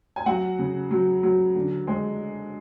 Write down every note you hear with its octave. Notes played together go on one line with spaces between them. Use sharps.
G#5
F#3 F#4 F#5
C#3
F#3
F#3
D3
G#3